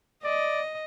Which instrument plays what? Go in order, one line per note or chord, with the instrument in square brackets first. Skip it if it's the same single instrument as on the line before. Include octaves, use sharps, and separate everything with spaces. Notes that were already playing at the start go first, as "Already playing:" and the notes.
[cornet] D5 [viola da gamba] D#5